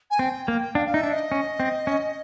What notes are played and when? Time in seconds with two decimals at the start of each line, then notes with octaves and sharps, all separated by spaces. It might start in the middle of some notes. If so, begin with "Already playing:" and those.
0.10 G#5
0.19 C4 G5
0.48 A#3
0.75 D4 F5
0.86 F5
0.94 D#4 E5
1.03 D4
1.12 D#5
1.32 C#4
1.60 C4
1.87 C#4